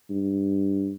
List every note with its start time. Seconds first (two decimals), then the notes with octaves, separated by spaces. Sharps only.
0.10 G2